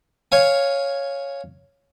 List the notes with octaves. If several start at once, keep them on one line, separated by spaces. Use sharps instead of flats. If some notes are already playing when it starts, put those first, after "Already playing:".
C#5 F5 G#5